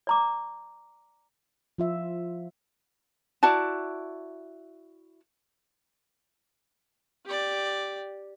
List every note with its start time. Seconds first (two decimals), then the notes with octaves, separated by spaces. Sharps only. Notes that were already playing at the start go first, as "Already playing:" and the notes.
0.07 D5 A#5 D6
1.78 F3 F4 E5
3.43 E4 F#4 D5 A5
7.25 G4 D5